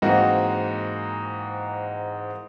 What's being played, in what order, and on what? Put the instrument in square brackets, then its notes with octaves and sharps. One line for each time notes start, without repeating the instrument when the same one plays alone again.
[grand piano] G#2 E3 A#3 C4 D#4 F#4